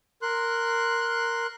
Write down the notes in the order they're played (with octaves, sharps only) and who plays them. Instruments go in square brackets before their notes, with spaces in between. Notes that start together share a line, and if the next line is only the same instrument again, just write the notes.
[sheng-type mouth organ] A#4 C6 F#6